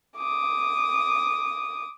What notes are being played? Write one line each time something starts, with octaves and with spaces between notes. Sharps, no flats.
D6 D#6